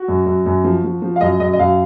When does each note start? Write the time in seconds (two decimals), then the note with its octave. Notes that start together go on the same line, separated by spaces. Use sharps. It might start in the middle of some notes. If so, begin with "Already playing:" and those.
Already playing: F#4
0.08 F#2
0.26 F#2
0.46 F#2
0.64 F3
0.84 F3
1.02 F3
1.16 F5
1.21 F#2 D#5
1.40 F#2 D#5
1.53 D#5
1.59 F#2 F5